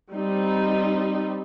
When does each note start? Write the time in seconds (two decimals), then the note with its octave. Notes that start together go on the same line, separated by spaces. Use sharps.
0.11 G3 C4 D#4